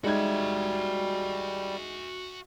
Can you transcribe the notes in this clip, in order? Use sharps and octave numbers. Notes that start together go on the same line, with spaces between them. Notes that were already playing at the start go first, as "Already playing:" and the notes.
G3 G#3 D#4 F#4 E5 G#6